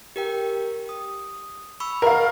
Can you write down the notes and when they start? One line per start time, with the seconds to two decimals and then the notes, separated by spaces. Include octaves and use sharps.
0.16 G4 A#4 G5
0.89 D#6
1.80 B5 C#6 E6
2.02 A#4 D#5 F5 F#5